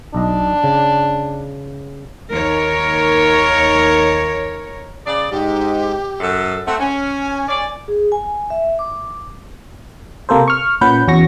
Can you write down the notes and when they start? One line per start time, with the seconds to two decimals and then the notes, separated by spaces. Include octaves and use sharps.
0.15 B1 D4 D#5
0.64 C#3
2.32 D#2 A#4 C#5
5.06 C#3 G#4 D5
5.31 G#2 G4
6.19 F#2 A4
6.66 A3 C4 F#5
6.79 C#4 G#5
7.48 G#4 C#5 D5
7.88 G#4
8.12 G#5
8.50 E5
8.79 D6
10.29 C3 A#3 A4 C5
10.48 C#6 F6
10.81 A#2 C#4 B4 F#5 G6
11.08 E2 C#4 F#4 C#6 A#6